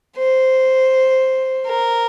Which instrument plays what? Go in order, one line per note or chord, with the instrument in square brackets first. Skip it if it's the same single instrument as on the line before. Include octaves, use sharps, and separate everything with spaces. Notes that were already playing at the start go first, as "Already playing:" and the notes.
[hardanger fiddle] C5
A#4